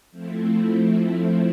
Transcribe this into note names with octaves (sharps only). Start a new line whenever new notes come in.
F3 A3 C4 E4